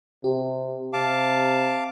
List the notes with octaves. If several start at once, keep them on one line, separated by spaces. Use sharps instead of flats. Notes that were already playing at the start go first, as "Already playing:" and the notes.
C3 G4
C3 F5 A5 D6